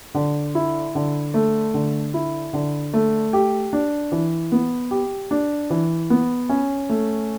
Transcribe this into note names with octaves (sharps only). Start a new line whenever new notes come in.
D3
E4
D3
A3
D3
E4
D3
A3
G4
D4
E3
B3
G4
D4
E3
B3
C#4
A3